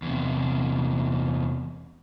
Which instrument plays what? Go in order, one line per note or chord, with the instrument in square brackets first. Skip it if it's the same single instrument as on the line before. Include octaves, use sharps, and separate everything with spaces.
[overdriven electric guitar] E2 C3